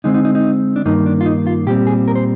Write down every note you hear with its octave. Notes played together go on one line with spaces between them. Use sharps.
D3 G#3 C4 D#4
D#4
D#4
D#4
D4
G2 D#3 A#3 D#4
D4
F4
D#4
F4
A#2 G3 C4 G4
G#4
A#4
C5